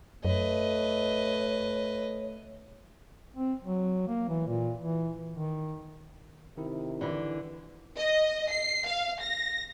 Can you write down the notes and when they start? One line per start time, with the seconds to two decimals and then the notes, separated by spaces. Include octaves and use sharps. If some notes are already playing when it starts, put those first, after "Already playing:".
0.25 F#2 A3 B4 C#5 D#5
3.36 C4
3.64 F#3
4.08 A#3
4.29 E3
4.47 A#2
4.82 E3
5.34 D#3
6.57 C3 D#3 E4
7.01 D3 E3
7.97 D#5
8.51 C7
8.87 F5
9.21 A#6